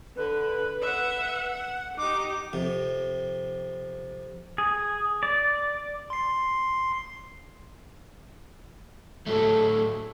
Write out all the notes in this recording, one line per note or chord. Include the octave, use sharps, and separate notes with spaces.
D3 B4
E5 F#5
F#5
D#4 G4 D6
F2 C3
G#4
D5
C6 C7
A2 F#3 A3 A4